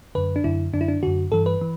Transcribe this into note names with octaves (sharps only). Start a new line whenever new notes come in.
F#2 D3 B4
D4
F#2 D3 E4
F#2 D3 D4
E4
D4
F#2 D3 F#4
G2 E3 A4
B4
E3